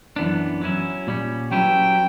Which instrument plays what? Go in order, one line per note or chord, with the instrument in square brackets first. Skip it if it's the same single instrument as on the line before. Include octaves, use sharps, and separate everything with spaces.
[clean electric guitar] F#2 E3 B3 D4
F#3 C#4 E4
A#2 G3 C#4
[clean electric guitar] F#3 C#4 E4 G4 B4 [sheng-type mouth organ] G5